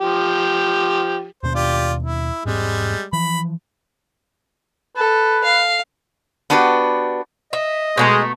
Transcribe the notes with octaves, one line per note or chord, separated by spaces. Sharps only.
F3 G4
D#2 B2 D4 C5
F4 G4 D5
E4
E1 G#2 G3 G#3 C4
E3 F3 B5
A4 B4
F5
B3 D4 F#4 G4 B4
D#5 E5
B2 G#3 A3 A#5